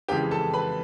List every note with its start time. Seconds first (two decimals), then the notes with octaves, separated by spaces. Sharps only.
0.08 F2 C#3 E3 G#3 G4 G5
0.31 A4 A5
0.54 B4 B5